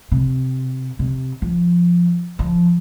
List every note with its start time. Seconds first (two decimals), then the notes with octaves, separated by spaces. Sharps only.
0.12 C3
0.99 C3
1.42 F3
2.39 F3